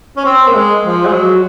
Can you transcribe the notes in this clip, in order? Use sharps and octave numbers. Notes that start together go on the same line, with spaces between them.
C#4
C4
A#3
G#3
F3
G#3
F#3